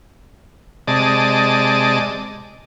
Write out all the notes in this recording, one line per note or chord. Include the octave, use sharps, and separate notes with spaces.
C3 G#3 D5 D#5 A5